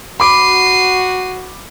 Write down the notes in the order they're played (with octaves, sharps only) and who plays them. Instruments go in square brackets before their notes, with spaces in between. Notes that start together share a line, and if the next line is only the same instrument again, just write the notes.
[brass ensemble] F#4 [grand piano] B5 D6 [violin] C7 D#7